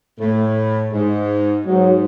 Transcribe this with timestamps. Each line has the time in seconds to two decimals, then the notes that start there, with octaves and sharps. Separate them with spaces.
0.19 A2 A3
0.92 G#2 G#3
1.65 G#2 F#3